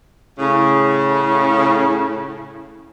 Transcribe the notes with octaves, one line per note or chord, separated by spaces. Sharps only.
A2 C#3